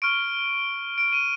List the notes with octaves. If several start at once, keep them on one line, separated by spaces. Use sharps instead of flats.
C#6 F6 D7
D7
D#7